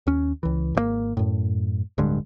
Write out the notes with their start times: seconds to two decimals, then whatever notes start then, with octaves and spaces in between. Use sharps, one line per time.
0.07 D#2 C#4
0.43 C#2 E3
0.75 G#1 D#3 A#3
1.17 F#2 A2
1.98 D1 G2 D3 G#3